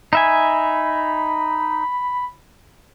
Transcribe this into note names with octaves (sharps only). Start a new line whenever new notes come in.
D#4 E5 G#5 B5